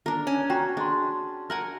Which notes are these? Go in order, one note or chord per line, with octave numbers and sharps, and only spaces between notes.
D4 A#4
C#4
F#4 G5 A#5
D4 G#4 C6
A#4 F#5 G#5